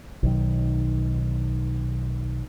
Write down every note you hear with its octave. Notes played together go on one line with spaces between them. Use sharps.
B1 D#3